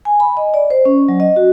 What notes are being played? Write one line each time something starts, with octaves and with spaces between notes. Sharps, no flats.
G#5
B5
D#5
D5
C5
C#4
F#3
D#5
F#4